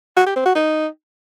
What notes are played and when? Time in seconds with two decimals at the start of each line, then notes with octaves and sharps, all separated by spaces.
0.17 F#4
0.26 G4
0.36 C4
0.45 F#4
0.55 D#4